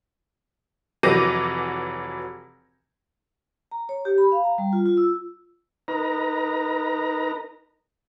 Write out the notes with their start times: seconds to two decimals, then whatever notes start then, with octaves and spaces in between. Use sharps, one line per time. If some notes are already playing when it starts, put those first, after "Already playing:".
1.03 F1 E3 F#3 D6 A#6 D#7
3.71 A#5
3.89 C#5
4.05 G4
4.18 B5
4.32 F5
4.44 A#5
4.58 G3
4.73 F4
4.86 F4
4.97 E6
5.88 D#4 A#4 B4 A#5